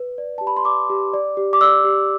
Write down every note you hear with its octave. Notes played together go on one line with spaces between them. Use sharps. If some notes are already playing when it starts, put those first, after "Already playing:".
Already playing: B4
D5
G4 A5
B5
C6
D5 D6
G4
D5
G4
D6
D5 E6
G4